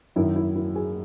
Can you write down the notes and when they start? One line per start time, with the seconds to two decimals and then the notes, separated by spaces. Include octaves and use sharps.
0.16 F#2 D#3 E4
0.36 E4
0.55 E4
0.76 G#4